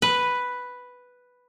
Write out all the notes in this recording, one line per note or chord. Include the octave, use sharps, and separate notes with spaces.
B4